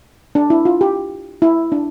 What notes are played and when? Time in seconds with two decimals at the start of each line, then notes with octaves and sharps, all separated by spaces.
0.35 D4
0.50 E4
0.65 F4
0.81 G4
1.42 E4
1.72 D4